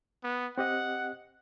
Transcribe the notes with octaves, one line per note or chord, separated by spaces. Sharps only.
B3
C4 G4 D#5 F#5